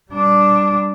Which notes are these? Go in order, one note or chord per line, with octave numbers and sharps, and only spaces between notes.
G3 D4